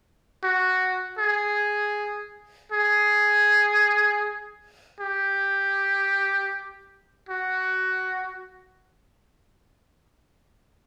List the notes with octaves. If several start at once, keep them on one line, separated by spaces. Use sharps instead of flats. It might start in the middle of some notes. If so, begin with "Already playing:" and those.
F#4
G#4
G#4
G4
F#4